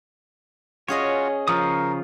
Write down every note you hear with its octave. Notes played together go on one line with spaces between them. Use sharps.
C#4 F4 F#4 G#4 C#5 D#5
C#3 F3 A#4 C#6 D#6